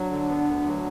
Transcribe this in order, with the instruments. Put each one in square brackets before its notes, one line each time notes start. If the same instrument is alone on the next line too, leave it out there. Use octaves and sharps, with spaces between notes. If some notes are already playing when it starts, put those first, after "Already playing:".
Already playing: [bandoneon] F#3 [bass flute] D4
[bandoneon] D3
B3
D2
F#3